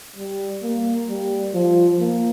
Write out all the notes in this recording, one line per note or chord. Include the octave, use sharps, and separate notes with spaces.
G3
A#3
G3
F3
A#3